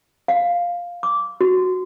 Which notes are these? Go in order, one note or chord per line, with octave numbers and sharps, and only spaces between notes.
F5
D6
F#4